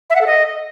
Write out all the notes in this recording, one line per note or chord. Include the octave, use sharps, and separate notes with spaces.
E5
F#5
A4
D#5